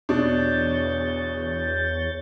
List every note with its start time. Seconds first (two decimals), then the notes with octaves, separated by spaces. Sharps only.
0.09 E2 B2 D4 C#5 G6 A6